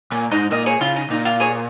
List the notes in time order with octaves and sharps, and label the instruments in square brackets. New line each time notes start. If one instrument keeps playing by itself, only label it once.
[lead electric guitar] A#2 [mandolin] C#4
[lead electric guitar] G#2 [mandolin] D#4
[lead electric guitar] A#2 [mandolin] A#4 D#5
[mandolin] G#4 C#5
[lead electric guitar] C#3 [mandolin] F4
[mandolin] D#4
[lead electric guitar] A#2 [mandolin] D#4
[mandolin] F4
G#4 C#5